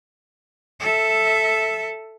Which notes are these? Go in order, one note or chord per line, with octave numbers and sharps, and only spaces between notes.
A4 E5